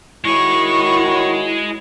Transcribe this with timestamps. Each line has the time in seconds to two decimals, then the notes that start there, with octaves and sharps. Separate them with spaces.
0.25 D#3 G#3 E4 F#4 C#5 C#6